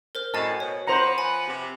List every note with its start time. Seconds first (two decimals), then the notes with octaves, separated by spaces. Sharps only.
0.15 A#4 C5 F6
0.34 F#2 A2 D#5 G#5 A5 C7
0.60 B2 C#5
0.87 F3 B4 C5 F#5 A#5
1.18 G#5 B5
1.48 C3